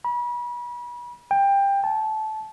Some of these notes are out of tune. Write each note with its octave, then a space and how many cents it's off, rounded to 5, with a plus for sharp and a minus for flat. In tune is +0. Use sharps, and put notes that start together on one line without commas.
B5 -35
G5 +20
A5 -20